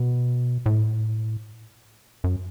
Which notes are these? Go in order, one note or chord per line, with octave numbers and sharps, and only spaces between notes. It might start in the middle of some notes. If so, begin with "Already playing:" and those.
Already playing: B2
A2
F#2